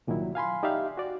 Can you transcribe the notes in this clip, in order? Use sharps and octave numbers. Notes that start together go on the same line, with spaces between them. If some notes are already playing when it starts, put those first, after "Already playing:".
C2 A#2 D#3 F#3 E4
F5 G#5 B5 C6
D#4 G4 D5 E5 F5
F#4 D5